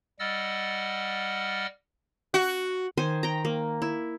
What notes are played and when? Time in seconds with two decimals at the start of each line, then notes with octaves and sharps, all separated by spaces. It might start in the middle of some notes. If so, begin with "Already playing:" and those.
0.19 G3 D#5 F#5 E6 F6 A6
2.34 F#4
2.97 D#3 C5 G#5 C6
3.23 G5 A#5
3.45 A#3
3.82 E4